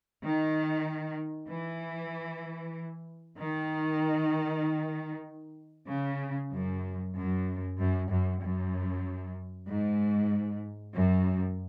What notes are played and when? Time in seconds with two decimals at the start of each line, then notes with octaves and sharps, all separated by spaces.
0.25 D#3
1.50 E3
3.40 D#3
5.90 C#3
6.53 F#2
7.17 F#2
7.79 F#2
8.11 F#2
8.43 F#2
9.68 G#2
10.94 F#2